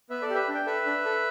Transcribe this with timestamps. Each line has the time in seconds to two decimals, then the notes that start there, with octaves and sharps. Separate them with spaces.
0.10 B3 B4 E5
0.22 A4 D5
0.29 G4
0.35 B4 E5
0.48 D4
0.55 G5
0.66 A4 B4 E5
0.86 D4
1.05 A4